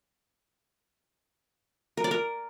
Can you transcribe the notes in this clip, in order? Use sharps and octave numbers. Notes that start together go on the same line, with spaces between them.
A#4
D5
A#4